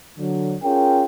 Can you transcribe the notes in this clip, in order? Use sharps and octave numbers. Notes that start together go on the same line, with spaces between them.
D3 F#3
C#4 F4 G#4 A#4 G5